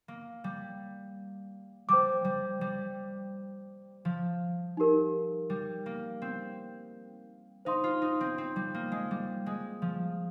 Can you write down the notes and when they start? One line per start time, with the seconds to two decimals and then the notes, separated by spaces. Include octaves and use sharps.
0.08 A#3
0.44 G3
1.89 G3 C5 G5 D6
2.25 G3
2.61 G3
4.05 F3
4.77 D#4 G4 A#4
5.50 G3
5.86 A#3
6.22 C4
7.65 D#4 C5 F5 C6
7.84 F4
8.02 D#4
8.21 C4
8.38 C4
8.56 G3
8.74 A#3
8.92 G#3
9.11 G3
9.46 G#3
9.82 F3